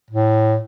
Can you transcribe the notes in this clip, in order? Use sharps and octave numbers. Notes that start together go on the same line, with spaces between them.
A2